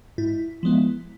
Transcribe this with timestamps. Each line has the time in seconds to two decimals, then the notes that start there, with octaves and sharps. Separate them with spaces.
0.18 G#2 E4
0.63 F3 G#3 B3